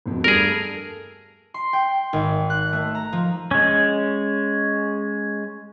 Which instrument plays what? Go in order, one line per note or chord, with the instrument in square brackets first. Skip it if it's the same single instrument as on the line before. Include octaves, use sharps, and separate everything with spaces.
[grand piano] E1 F2
[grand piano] G2 G3 A3 [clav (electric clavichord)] G#4 A#4
[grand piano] A4
[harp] C6
G5
G#1
F#6
A3
A#5
F3
[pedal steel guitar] G#3 C#4